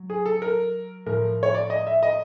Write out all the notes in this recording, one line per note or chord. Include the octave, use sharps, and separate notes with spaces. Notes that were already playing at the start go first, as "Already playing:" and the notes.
Already playing: F#3
G#4
A4
A#4
A2 F3 A#4
C#5
D5
D#5
E5
D#5